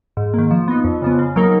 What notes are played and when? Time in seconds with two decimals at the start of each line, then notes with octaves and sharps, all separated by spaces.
0.17 G#2
0.34 D#3 A#3
0.51 F3
0.68 B3 D#4
0.84 F2
1.02 C#3 F3 B3
1.19 C#3
1.36 F#3 A#3 D#4 A#4